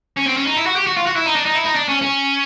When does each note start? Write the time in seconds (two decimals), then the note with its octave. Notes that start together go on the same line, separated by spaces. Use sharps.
0.17 C#4
0.27 C4
0.37 C#4
0.47 D#4
0.57 E4
0.66 F#4
0.76 G4
0.87 F#4
0.97 F4
1.06 F#4
1.16 E4
1.26 D#4
1.36 D4
1.46 D#4
1.55 E4
1.65 D#4
1.76 D4
1.89 C#4
2.02 C#4